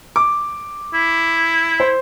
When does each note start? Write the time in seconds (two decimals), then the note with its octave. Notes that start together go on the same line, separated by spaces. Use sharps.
0.16 D6
0.94 E4
1.80 C5